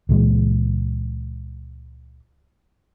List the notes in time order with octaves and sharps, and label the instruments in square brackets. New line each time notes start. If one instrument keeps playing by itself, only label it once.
[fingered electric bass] C#2 A#2 E3 G#3